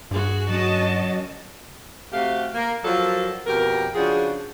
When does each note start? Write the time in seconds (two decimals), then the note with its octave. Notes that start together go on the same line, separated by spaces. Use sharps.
0.11 G2 F#4 G#4
0.49 F#3 C#4 F#4 D#5 A5
2.13 C3 A3 F#4 G4 F5
2.55 A#3
2.84 F3 F#3 F4 A4 A#4 D5
3.47 F2 B2 G4 A#4
3.95 C#3 F3 D4 F#4 G#4